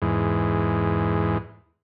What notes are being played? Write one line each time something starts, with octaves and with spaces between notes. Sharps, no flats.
E2 G#2